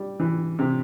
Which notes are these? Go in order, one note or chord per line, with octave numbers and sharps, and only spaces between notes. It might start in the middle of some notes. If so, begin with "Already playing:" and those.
Already playing: G3
E3
C3